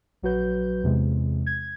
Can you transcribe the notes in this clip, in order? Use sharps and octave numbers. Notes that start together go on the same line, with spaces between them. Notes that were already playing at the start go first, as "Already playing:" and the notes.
A#1 F#3 F#4 B4 G6
E2 C3 G#3
G#6